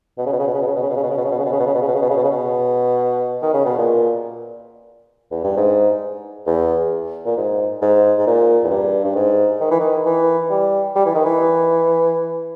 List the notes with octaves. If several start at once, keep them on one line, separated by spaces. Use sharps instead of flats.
B2
C#3
B2
C#3
B2
C#3
B2
C#3
B2
C#3
B2
C#3
B2
C#3
B2
C#3
B2
C#3
B2
C#3
B2
C#3
B2
C#3
B2
C#3
B2
C#3
B2
C#3
B2
D#3
C#3
B2
A#2
E2
G2
G#2
E2
A#2
G#2
G#2
G#2
A#2
E2
G2
G2
G#2
D#3
E3
D#3
E3
G3
G3
E3
D#3
E3